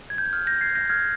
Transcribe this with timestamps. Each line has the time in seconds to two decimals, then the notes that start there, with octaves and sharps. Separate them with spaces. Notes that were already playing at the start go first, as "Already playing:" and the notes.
0.10 G#6
0.18 G6
0.33 F6
0.47 G6 A#6
0.61 G#6 C7
0.75 G6 A#6
0.89 F6 G#6